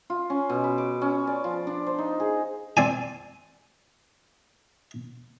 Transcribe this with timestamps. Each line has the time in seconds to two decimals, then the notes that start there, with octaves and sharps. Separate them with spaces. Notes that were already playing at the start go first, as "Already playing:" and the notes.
0.10 F4
0.30 C#4
0.49 B2
0.64 B4
0.78 D6
1.02 C#4
1.27 D5
1.44 F3
1.67 D4
1.87 C5
1.98 D#4
2.20 G#4
2.77 C4 D5 G#5